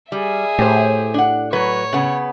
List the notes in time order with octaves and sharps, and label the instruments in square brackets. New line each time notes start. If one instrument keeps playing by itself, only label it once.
[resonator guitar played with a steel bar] G3 [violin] G#4 E5
[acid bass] A2 [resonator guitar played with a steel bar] G4 C5
[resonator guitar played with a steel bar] D4 F#5
[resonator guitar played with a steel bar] F#3 B4 [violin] C#5
[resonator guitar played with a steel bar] C#3 B3